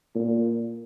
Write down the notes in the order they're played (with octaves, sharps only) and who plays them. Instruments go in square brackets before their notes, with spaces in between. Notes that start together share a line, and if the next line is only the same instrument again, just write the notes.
[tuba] A#2